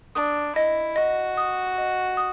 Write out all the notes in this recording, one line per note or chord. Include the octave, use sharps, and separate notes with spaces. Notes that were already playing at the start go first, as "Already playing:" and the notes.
D4 D#6
E4 D#5
F#4 D#5
D#6
D#5
D#6